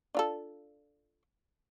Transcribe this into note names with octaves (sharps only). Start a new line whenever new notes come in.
D4 F4 A4